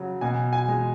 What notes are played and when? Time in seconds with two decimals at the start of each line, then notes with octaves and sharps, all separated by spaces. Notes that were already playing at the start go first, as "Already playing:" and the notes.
Already playing: C#3 F#3
0.21 B2 G#5
0.53 G#5
0.68 G#3